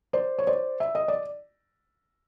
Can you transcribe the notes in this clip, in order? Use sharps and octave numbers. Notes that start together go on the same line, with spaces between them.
C5 D5
C#5
C5 D5
E5
D#5
D5